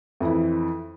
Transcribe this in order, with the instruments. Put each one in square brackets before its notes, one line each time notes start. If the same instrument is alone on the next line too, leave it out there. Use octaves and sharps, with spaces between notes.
[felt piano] F2 E3 E4